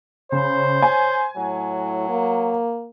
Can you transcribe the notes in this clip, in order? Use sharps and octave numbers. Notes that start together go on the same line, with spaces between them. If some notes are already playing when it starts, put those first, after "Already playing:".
C#3 C5 C#5
G#5
A2 F#3
A#3